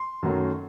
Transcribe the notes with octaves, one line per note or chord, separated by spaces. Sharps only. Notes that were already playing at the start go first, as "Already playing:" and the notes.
Already playing: C6
F#2 D#3 F#3 A3